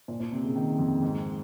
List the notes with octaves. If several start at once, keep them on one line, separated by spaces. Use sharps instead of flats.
A#2
A#2
C3
C#3
D#3
F2
G#2